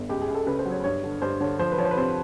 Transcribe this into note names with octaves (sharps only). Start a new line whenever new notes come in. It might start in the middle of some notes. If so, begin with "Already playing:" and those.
Already playing: G1
C#2 G4
G#4
C#2
A4
C#3 B4
C5
F#3
C#5
G2 C#5
D3
G2 C5
D3 C#5
F3 C5
B4
F3 C#5
C5
B4
C3 C5